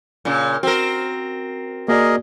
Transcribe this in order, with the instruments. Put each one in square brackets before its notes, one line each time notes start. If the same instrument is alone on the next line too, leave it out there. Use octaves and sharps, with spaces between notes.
[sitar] A#2 C#3
[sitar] C4 A#4 [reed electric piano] F#4
[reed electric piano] A#3 F#4 D5 [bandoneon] G#4 A#4 D#5